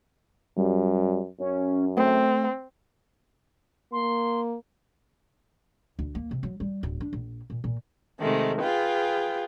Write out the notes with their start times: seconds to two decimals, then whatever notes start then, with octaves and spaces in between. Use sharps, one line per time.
0.57 F#2 G3
1.39 F#2 C#4
1.97 A3 C4
3.92 A#3 C6
5.99 D2
6.15 A#3
6.31 C3
6.43 F#3
6.60 G3
6.83 D1
7.01 D4
7.13 A#1
7.50 A#2
7.64 A#2
8.20 C3 D#3 G#3 A3
8.62 F4 G#4 B4 G5